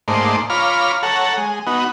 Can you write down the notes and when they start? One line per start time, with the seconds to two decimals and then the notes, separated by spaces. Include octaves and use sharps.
0.08 G#2 A3 A#3 D#4 C5 D5
0.50 F4 C#5 A#5 B5 D6 F6
1.03 A4 C#5 F#5 A#5
1.37 G#3
1.67 B3 D#4 F#4